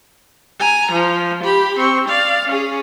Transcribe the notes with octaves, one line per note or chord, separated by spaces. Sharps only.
G#5 A#5
F3
G4 B5
C4 C#6
D5 F5
C#4 G#4